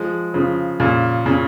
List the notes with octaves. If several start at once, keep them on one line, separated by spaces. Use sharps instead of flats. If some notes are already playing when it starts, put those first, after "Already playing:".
Already playing: F3 G#3
C#3 F3
A#2 C#3
A#2 C#3